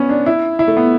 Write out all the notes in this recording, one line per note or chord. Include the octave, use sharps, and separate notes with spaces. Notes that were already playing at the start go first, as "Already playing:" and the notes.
Already playing: B3 C#4
D4
E4
E4
A3
B3